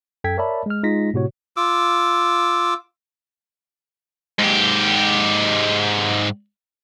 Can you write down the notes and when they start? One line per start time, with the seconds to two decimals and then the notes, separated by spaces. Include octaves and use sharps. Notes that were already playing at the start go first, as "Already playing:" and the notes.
0.24 F#2 A4 G5 G#6 B6
0.37 A#4 C#5 D5 E5 A5 B5
0.66 G#3 F6
0.83 G#3 D#4 F4 A#6 B6
1.14 A2 C3 F#4 C#5
1.57 F4 D6 E6
4.39 G#2 G4